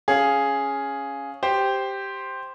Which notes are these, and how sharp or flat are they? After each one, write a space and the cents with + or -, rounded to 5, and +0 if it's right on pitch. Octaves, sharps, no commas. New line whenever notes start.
C#4 +0 G#4 +0 F5 +0
G4 +0 C5 +0